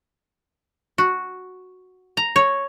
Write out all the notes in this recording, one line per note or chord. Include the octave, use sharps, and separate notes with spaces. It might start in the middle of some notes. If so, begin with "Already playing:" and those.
F#4
A#5
C#5